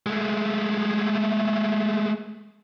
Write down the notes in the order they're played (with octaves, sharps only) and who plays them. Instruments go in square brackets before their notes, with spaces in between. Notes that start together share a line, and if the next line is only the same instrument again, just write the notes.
[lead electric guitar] G#3 A3